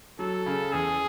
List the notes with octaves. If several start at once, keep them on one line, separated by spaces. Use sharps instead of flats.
F#3 A4
C#3
E2 G#4